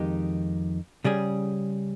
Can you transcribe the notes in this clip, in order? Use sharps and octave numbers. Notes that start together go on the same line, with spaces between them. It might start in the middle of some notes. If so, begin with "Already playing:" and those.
Already playing: F2 D#3 G#3 D#4 G4
C#3 G3 C#4 G#4